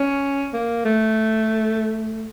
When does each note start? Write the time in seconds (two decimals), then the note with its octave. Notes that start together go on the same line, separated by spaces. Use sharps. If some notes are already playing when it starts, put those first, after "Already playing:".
Already playing: C#4
0.53 A#3
0.85 A3